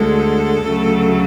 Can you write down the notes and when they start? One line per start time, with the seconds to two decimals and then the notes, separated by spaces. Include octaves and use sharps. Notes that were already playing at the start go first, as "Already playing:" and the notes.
Already playing: D2 D3 G#3 A4
0.63 D2 C#3 F#3 A3